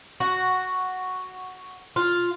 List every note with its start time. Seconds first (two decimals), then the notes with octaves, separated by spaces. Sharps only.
0.20 F#4
1.96 F4